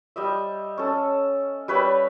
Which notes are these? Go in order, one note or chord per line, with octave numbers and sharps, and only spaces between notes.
G3 D#5 E5
C#4 A4
G3 B4 C#5 E5